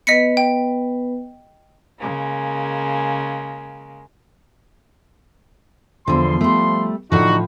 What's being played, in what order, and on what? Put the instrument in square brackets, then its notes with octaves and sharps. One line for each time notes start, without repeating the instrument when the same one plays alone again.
[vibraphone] B3 B4 [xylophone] D#5 B6 C#7
[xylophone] G5
[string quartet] C#3 G#3 A#3
[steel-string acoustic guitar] E2 D3 [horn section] F3 C6
[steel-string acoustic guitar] G3 A3
[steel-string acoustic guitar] A2 F3 [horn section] D3 D#4 F#4